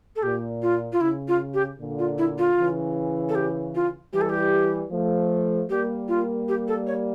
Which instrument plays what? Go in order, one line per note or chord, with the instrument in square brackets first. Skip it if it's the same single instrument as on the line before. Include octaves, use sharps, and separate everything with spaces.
[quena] A4
[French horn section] A#2 [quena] G4
[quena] F4
F4
[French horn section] C#3 [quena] E4
[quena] F4
G4
[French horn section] A#2 D3
[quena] F4
E4
F4
[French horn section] C#3 E3
[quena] A4
G4
F4
[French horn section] E3 G3 [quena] G4
[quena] A4
G4
[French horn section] F3 A3
[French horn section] G3 A#3 [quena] G4
[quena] F4
G4
A4
C#5